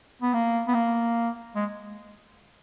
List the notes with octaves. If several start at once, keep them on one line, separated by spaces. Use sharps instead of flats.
B3
A#3
B3
A#3
G#3